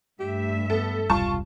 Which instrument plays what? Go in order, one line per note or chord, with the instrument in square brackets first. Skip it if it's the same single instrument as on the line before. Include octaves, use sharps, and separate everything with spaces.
[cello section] G2 A3 E5 [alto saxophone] G4
[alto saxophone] B3 [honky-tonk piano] A4
[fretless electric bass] E1 C2 G3 [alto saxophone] F4 [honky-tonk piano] A5 C#6